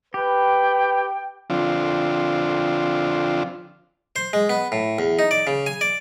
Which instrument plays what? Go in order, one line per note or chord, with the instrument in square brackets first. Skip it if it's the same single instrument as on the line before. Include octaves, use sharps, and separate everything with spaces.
[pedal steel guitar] G4 [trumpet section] B4 [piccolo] G5
[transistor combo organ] D3 F3 C4 D4 F4
[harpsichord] C5
G#3
B3
A2
E2
D#4
D5
C#3
G#5
D5